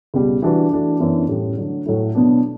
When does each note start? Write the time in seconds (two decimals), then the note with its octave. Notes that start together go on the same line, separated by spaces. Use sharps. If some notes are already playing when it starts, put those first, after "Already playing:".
0.14 C#2 B2 G3
0.42 E3 G3 D4 F#4 B4
0.71 E3 A3 D4 F#4
0.99 F#2 E3 B3 D4
1.29 A2 G3 C#4
1.57 D3 F#3 A3
1.86 A2 F#3 A3 E4
2.15 B2 F#3 B3 D4